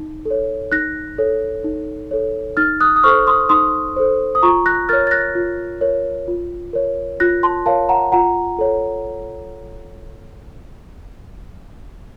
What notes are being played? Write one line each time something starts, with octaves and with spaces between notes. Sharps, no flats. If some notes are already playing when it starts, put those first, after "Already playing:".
Already playing: D#4
A4
C#5
D#4 F#6 A#6
A4 C#5
D#4
A4 C#5
D#4 F6 A6
D#6 F#6
D#6
A4 C5 C#6 F6
C6 D#6
D#4 C6 D#6
A4 C5
D#6
F4 A#5 C#6
F#6 A#6
A#4 C#5 F6 A6
A6
F#6 A#6
F4
A#4 C#5
F4
A#4 C#5
F4 F#6 A#6
A5 C6
A#4 C#5 F5 A5
F#5 A#5
F4 F#5 A#5
A4 C#5